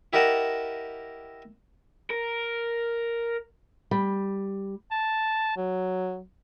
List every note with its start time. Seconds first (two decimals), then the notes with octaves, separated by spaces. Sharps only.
0.13 E4 G4 A#4 D#5 F#5 A5
2.10 A#4
3.91 G3
4.91 A5
5.57 F#3